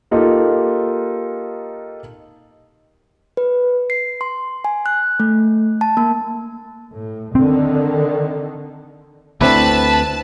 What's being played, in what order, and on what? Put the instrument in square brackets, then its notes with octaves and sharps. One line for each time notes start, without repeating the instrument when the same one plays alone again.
[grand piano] A#3 D#4 F4 G4 A4
[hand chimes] B4
C7
C6
G#5
F#6
A3
A5
A#3
[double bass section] A2
[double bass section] D3 D#3 [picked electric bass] C4
[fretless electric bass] D2 C4 [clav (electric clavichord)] A3 D4 E4 [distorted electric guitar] B4 [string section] A5